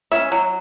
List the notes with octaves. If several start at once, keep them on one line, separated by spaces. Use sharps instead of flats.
C#4 E5
F#3